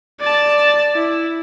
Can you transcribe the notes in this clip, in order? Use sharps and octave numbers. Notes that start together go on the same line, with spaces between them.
D5 A5
E4